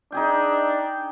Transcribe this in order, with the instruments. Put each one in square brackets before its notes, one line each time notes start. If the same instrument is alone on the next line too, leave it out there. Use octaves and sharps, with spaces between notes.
[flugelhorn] D4 [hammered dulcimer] D#4 G#4 G5